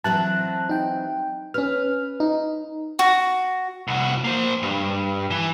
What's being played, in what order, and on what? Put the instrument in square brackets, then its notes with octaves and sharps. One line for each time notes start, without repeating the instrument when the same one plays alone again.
[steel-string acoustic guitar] E3 F#3 C4 [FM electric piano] A5 F#6
[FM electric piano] D#4 G5
[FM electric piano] C#4 F6 [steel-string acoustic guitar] B4
[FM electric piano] D#4
[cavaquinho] F#4
[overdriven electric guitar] C2 F#4
A#3 C5
G2
E3